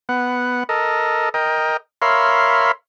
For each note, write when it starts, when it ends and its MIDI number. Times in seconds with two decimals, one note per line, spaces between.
0.09 0.64 59
0.09 0.64 78
0.69 1.29 69
0.69 1.29 70
0.69 1.29 75
1.34 1.77 70
1.34 1.77 75
1.34 1.77 79
2.02 2.72 70
2.02 2.72 73
2.02 2.72 76
2.02 2.72 77
2.02 2.72 83
2.02 2.72 84